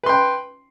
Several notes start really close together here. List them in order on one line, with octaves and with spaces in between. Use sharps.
B4 C6 G5